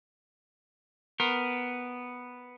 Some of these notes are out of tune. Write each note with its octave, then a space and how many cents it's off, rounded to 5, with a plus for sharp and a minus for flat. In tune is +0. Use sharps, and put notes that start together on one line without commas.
B3 +0 A#4 +0 C6 +35